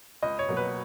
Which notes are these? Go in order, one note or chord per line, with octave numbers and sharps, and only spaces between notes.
C#2 D#5
C#5
B2 F#3 A#3
B4